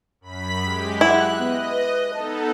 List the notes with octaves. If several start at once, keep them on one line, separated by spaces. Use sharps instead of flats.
F#2 B5 B6
G#3 G4
E4 F#5 F#6
B3 D#5
B4
B3 D#4 A4 A5